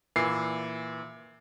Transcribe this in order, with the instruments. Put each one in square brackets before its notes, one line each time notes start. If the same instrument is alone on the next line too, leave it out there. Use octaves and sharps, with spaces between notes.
[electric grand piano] A#2 [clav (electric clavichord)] E3 [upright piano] C7